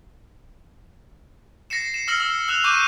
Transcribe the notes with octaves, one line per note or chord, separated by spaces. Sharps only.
A#6 C7 C#7 E7
E7
E6 F6 A#6 C#7 F#7
E6
E6 F#6 E7 F7
C#6 D6 F#6 G6 D#7 E7